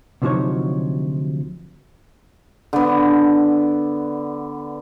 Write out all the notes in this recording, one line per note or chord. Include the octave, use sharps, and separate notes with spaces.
D2 C3 F3 F#3 D#4 C#5
D3 B3